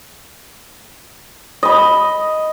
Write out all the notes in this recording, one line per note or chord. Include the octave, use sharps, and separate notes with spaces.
D#5 B5